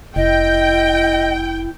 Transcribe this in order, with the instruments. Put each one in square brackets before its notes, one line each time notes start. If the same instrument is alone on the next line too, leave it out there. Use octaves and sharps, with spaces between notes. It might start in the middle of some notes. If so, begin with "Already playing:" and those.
[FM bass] F1 [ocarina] E4 [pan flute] D#5 [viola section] G5